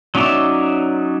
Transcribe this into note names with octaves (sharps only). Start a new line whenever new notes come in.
F#3 C#4 D#4 D5 E5